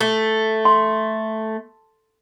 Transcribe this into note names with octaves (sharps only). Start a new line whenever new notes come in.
A3
C6